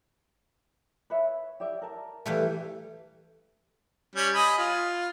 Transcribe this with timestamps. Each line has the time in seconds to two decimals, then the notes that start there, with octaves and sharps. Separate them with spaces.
1.10 B4 C#5 E5
1.60 G4 D5 E5
1.82 A#4 A5
2.26 E3 G3 A3
4.16 G3 C#4
4.34 D#5 G#5 B5
4.58 F4